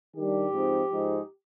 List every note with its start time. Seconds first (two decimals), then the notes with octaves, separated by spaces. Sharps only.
0.16 D#3 G3 D4 G4
0.52 G#2 F3 C4 D#4
0.89 G#2 F3 G#3 D#4